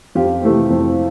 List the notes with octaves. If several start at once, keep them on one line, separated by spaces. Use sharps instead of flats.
F2 F4 G4
C3 E3 A3 C4
F2